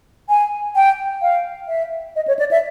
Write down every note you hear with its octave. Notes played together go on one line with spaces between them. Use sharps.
G#5
G5
F5
E5
D#5
C#5
D5
E5